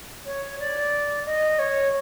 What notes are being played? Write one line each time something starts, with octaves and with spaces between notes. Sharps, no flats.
C#5
D5
D#5
C#5